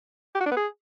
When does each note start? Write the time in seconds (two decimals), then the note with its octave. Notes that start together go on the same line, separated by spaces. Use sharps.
0.35 G4
0.41 F#4
0.46 D4
0.51 B3
0.57 G#4